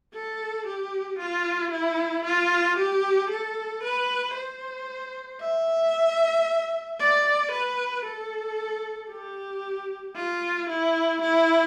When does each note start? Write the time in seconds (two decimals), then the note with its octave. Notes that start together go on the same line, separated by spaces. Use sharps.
0.13 A4
0.67 G4
1.19 F4
1.72 E4
2.25 F4
2.77 G4
3.31 A4
3.83 B4
4.35 C5
5.41 E5
7.00 D5
7.52 B4
8.05 A4
9.11 G4
10.16 F4
10.69 E4
11.22 E4